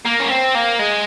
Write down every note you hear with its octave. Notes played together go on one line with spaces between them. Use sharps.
A#3
C#4
C4
A#3
G#3